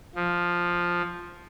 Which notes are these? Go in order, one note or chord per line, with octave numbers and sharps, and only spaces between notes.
F3